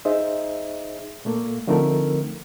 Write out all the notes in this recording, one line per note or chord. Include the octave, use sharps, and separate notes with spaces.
D#4 G#4 C5 D#5 E5
A#2 A3 A#3
D3 F3 A3 C4 D#4 A#4